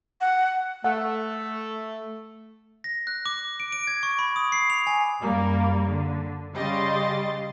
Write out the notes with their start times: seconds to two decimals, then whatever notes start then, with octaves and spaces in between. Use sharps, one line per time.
0.21 F#5
0.84 A3 F#5
2.84 A#6
3.07 F#6
3.26 D6
3.60 D7
3.72 D7
3.87 G#6
4.03 C#6
4.19 B5
4.36 D#6
4.52 C7
4.70 F7
4.87 G#5
5.20 F#2 G3 A#3
5.88 D3
6.54 C#3 G3 D#5 C6 A6